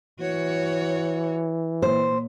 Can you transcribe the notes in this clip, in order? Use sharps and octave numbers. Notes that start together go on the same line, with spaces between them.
E3 F#4 C#5
A#2 C5